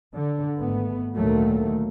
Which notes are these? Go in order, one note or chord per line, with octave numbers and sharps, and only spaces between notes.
D3
G#1 A3 B3
D2 A#2 D#3 F#3 A3 A#3